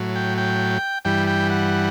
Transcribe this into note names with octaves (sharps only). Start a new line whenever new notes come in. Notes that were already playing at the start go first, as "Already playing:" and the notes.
Already playing: A2 F#3
G5
G5
G2 E3 G3 G5
G5
F#5